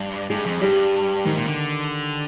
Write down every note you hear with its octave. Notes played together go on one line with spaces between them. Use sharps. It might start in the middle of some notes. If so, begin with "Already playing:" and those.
Already playing: G2
G2 G#3
F2
G2 G3
G#2 D#3
A#2
D3